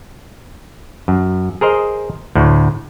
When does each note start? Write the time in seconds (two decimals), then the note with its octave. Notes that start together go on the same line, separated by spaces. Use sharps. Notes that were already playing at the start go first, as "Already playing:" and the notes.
1.08 F#2
1.61 G#4 A#4 C5 D#5
2.35 D2 A2